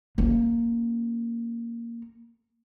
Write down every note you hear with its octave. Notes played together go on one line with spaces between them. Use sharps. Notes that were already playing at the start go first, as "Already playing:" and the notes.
A#3 C#4